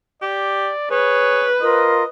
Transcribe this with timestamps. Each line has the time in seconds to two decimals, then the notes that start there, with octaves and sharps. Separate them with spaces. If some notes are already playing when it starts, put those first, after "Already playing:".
0.22 G4 D5
0.91 G#4 B4 C#5
1.61 F4 A#4 C5 D#5